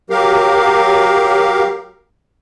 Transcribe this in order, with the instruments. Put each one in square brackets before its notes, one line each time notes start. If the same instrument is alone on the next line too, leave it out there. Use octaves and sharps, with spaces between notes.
[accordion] F#3 G4 A#4 F5